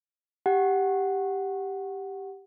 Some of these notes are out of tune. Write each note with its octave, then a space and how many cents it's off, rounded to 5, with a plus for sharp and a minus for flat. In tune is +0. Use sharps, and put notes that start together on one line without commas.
G4 +0 F#5 +0